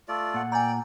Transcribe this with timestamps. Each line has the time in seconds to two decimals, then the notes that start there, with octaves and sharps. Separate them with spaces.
0.08 A3 F4 D5
0.34 A#2 F#5
0.52 D5 G5 G#5 A#5